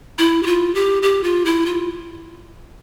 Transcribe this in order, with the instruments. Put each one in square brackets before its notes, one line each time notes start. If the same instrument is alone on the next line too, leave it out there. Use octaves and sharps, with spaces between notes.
[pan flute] E4
G4
F4
G4
G4
F4
E4
F4